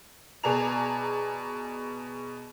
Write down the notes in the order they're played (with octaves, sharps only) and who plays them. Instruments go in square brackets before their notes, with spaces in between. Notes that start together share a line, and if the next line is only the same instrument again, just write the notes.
[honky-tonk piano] B2 G#4 D5 A5 A#5 F7